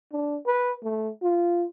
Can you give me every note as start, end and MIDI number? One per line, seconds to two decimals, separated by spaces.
0.12 0.38 62
0.46 0.74 71
0.83 1.10 57
1.22 1.64 65